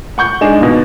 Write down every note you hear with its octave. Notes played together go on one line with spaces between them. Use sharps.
F#5 C#6 G6
G#3 D4 D#4 G#4 E7
D#2 B2